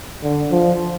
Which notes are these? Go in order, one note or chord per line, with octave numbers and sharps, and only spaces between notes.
D3
F3